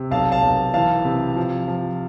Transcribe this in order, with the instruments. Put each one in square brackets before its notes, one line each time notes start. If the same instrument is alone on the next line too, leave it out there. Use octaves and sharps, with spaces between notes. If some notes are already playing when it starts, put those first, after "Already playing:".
Already playing: [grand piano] C3
B1 F5 A5
F5 A5
B1
E3 F5 A5
C3
F3
F3